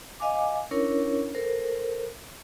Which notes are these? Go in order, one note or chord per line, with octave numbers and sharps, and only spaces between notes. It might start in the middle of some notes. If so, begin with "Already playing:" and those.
D#5 F5 G#5 D6
C#4 D4 E4 A#4 C#5
A4 A#4 C5